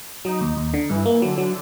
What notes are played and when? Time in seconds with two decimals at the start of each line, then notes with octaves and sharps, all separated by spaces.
0.25 F#3 D#4
0.41 D#2
0.57 D#2
0.74 D3
0.89 G2 E3
1.06 A#3
1.22 D3 F#3
1.38 F#3